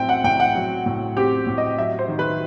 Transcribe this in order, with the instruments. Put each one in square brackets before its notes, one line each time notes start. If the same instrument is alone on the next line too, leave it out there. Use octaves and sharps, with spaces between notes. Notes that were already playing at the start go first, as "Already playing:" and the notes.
Already playing: [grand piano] A2 F#3 C4 [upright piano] E5 G5
[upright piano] F#5
[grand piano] A2 [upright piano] G5
[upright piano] F#5
[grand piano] F#3
A2
[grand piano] C4 [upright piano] G4
[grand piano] A2
[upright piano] D#5
[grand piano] F#3 [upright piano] E5
[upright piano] C5
[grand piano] D#3
[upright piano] B4